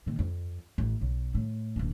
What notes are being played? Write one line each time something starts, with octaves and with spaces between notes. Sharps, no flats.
A#2 D#3
F2
A1
B1
A2
D#1 D4